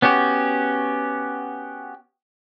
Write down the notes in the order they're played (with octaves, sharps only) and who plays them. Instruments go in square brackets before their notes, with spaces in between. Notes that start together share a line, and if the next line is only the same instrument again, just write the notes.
[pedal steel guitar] B3 C#4 F#4 G4